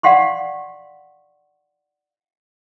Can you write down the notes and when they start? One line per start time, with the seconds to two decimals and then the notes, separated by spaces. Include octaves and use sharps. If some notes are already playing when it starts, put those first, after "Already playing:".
0.03 D5 F5 F#5 C6 C#6